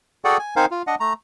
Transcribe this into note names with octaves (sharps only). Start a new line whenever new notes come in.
F#4 G#4 A4 D5 F#5 G5
G#5
C4 D#4 A#4 C5 F5 G#5
F4
D4 D#5 F#5
A3 A#5